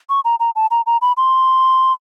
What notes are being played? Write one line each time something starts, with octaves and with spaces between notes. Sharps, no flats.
C#6
A#5
A#5
A5
A#5
A#5
B5
C6